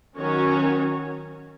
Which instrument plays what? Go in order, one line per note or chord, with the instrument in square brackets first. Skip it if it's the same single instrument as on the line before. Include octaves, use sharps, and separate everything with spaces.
[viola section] D#3 F#3 C#4 F#4 C#5